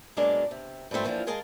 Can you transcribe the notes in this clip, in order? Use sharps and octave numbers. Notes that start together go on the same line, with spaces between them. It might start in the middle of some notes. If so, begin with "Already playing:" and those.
B2 F#3 G#3 A#3 D4 D5
C3
G2 F3 G#3 A3 C4
E3 F3 A#3 C#4 D4 F4
G#3 G#4 A#4 D#5 F5 A5